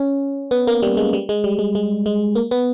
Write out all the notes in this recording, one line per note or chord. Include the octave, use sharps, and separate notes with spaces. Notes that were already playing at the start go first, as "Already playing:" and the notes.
Already playing: C#4
B3
A#3
G3
G#3
G3
G#3
G3
G#3
G#3
G#3
A#3
B3